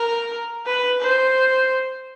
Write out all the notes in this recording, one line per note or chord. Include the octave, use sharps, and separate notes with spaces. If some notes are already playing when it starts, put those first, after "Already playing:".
Already playing: A#4
B4
C5